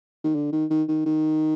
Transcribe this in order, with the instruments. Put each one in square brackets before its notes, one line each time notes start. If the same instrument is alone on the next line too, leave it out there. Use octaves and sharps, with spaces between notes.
[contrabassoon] D#3
D3
D#3
D#3
D#3
D#3